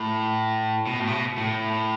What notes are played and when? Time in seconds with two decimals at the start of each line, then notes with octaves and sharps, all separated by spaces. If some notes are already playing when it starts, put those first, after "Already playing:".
Already playing: A2
0.87 B2
0.99 A2
1.07 C3
1.12 B2
1.37 A2